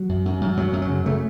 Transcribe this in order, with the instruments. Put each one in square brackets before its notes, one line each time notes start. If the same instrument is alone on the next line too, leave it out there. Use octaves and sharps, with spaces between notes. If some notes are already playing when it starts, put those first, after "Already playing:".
Already playing: [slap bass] F#3
F#2
F#2
F#2
F#2 F#3
F#2
F#3
C#3
C#3 A3